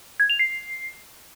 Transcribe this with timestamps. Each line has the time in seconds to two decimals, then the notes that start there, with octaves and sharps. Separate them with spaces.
0.20 G#6
0.30 F7
0.39 C7